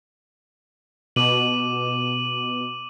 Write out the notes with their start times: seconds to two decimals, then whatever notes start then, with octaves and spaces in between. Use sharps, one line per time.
1.16 B2 D6 D#7 F#7